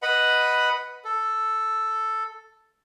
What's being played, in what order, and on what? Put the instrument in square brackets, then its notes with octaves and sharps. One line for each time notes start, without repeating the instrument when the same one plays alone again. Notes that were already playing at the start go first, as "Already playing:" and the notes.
[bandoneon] B4 D#5 F#5 B5
A4